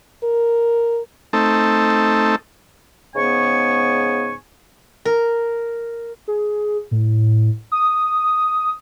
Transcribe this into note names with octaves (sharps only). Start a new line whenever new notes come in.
A#4
A3 C4 D#4 A4
G#2 C#3 B3 G#5 C#6
A#4
G#4
A2
D#6